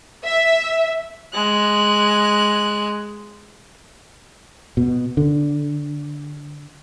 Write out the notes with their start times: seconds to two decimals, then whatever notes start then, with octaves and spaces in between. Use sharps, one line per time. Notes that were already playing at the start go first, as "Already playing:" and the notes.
0.24 E5
1.34 G#3 F#6
4.77 B2
5.17 D3